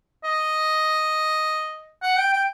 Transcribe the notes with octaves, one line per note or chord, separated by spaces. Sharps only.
D#5
F#5
G5
G5